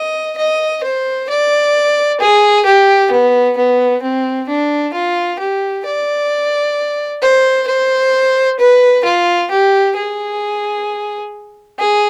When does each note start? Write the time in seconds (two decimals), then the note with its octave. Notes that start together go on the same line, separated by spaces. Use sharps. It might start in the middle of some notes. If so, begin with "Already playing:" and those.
Already playing: D#5
0.37 D#5
0.84 C5
1.30 D5
2.21 G#4
2.65 G4
3.11 B3
3.58 B3
4.03 C4
4.49 D4
4.94 F4
5.39 G4
5.86 D5
7.22 C5
7.68 C5
8.59 B4
9.04 F4
9.51 G4
9.96 G#4
11.79 G#4